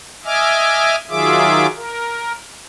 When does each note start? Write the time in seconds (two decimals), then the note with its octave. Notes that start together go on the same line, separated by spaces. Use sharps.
0.25 D#5 E5 G#5 D6 F6
1.10 D#3 F#3 F4 G#4 E5 D6
1.76 A#4